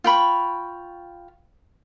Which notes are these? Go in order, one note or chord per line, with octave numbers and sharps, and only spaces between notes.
F4 G5 B5 C#6